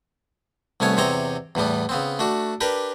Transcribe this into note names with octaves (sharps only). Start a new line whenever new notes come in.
C2 A3 B3 C#5 G#5
E2 C3 C4 C#5 D#5 A#5
E2 A2 G3 B3
C#3 B3 C4
A3 D4 F#4
D4 G4 A#4 B4